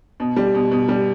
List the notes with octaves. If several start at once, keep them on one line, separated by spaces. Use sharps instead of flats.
B2
G3
B2
B2
G3